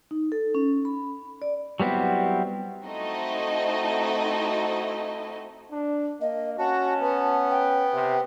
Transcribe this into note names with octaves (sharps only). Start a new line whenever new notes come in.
D#4
A4
C#4
B5
D5
F#3 G3 B3 C4 E4
A3 C4 D#4 E4 F#4 D#5
D4
A#3 D#5
C#4 F#4 A5
B3
G5
C3